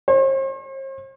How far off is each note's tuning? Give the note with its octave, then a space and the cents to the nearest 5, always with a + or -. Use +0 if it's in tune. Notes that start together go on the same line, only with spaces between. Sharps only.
C5 +45